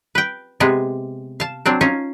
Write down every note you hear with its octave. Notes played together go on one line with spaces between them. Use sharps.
B4 G5
C3 G#3 B3
F5 A5
F#3 C4 D4
C#4 D#4 F4